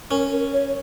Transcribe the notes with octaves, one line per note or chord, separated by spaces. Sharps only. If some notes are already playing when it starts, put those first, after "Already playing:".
C#4 A#4
A#4
C#5